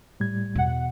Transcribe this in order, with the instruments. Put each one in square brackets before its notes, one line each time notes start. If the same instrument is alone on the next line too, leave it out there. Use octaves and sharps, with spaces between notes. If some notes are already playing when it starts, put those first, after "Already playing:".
[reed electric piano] A2 G3 G#6
[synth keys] E2 F#5 [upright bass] B2